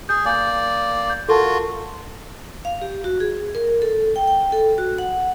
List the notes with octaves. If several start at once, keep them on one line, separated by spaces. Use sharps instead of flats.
G#4 G6
A#3 D5 G#5 G6
G6
F4 F#4 A4 A#4 A5
F5
G4
F#4
G#4
A#4
A4
G5
G5
A4
F#4
F#5